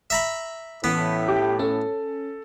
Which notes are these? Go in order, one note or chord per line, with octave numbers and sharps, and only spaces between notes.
E5 A#5 B5
A2 E3 B3 C#4 B6
G4
C#4 A4